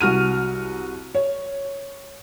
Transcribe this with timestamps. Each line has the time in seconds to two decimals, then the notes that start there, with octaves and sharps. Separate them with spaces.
0.01 C2 F#4 F6 D#7
1.15 C#5